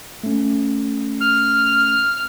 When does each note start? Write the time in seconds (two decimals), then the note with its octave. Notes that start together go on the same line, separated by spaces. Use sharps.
0.24 A3 C#4
1.21 F6